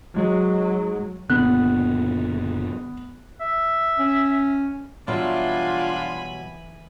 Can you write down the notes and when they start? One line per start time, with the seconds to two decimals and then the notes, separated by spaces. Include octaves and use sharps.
0.16 G#2 F#3 G#3
1.30 F#1 A#2 D3 B3 F#6
3.41 E5
3.99 C#4
5.08 B2 E3 F#3 G3 D4 F4 G#5 B5